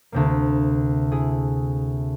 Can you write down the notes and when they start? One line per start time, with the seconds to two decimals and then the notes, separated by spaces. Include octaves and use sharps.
0.12 D2 C3 A#3
1.12 E4 G#4